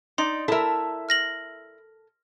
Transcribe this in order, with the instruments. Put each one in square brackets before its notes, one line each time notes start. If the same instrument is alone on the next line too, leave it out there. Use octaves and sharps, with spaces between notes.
[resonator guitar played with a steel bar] D#4 D5 [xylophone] C6
[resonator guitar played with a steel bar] E4 E5 [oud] A4 A#4
[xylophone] F6 A#6 F#7